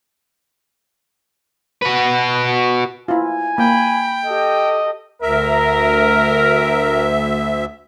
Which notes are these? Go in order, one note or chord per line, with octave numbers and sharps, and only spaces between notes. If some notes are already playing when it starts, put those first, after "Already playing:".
F#4 B4
E4 F4 G#5
A#3 G5 B5
G4 A4 D#5
D2 A#4 E5